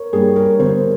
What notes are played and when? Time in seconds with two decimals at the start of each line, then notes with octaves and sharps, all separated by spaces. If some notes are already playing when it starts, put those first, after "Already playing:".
Already playing: A#4 C#5
0.13 G2 G3 A#3 G#4
0.36 A#4
0.59 G1 C5